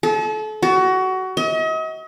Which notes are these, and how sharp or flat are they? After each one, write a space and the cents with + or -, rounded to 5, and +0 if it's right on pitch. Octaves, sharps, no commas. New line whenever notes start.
A4 -35
F#4 +20
D#5 +40